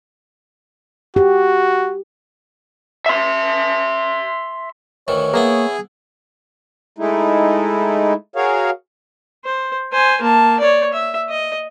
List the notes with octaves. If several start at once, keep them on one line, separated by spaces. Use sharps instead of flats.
F#4 G4
E5 C6
D2 D#3 E3 C#5
E3 A#3 B3 E4 G#4
G#3 A3 D#4 E4
F#4 G#4 A#4 C#5 F5
C5
C5 G#5
A#3 A5
C#5 D5
E5
D#5